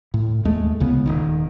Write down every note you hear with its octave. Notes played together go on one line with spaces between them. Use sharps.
A2
D#2 G#3 A3
C2 C#3 B3
D#1 G#1 D#3